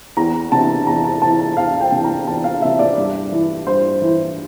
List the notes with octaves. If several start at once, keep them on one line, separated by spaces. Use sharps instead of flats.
E2 A#5
C3 E3 A5
E2 A#5
A5
C3 E3 A5
E2 F5
G5
C3 E3
A#5
E2 A5
F5
C3 E3 E5
D5
G2 D5
E3
G2 C5
E3